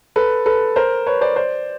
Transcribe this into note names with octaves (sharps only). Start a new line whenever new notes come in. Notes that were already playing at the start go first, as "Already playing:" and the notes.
A4 B4
A4 B4
A#4 C5
B4 C#5
C5 D5
C5 D5